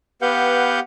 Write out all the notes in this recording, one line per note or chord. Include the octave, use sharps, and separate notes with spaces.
B3 G4 B4 F5 F#5 G6